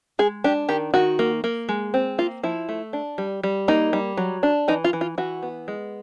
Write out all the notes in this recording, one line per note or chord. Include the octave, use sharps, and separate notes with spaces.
G#3 G#4
D4 G4
D#3 G4
D#3 F#4
A#3
A#3
G#3
C4
A#3 F4
F3 E4
A3
D4
G3
G3
A#3 D#4
G3
F#3
D4
E3 D#4
F4
E3
F4
E3 F#4
B3
G#3